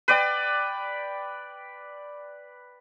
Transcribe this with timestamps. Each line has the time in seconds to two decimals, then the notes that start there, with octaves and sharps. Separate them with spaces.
0.08 B4 D5 G5